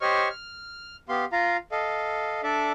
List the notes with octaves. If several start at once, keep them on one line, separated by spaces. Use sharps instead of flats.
G4 C5 C#5 D#5 C#6 F6
F6
B3 G4 F5 C6
F4 F5 A#5
A4 D#5 F5
D4 A4 D5 E5